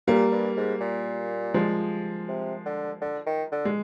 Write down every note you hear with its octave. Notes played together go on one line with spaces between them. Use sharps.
A#2 G3 A#3
G2
G#2
A#2
F3 G#3
C3
D3
D3
D#3
D3
G#3